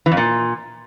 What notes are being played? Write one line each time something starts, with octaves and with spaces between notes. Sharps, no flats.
E3
F2
A#2